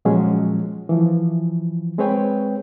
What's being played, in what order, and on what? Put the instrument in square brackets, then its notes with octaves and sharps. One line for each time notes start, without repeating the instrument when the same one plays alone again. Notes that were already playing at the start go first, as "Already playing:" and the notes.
[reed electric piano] A#2 F3 F#3 G#3 C#4 G#4
E3 F3
G#3 C4 G#4 B4 C#5 G5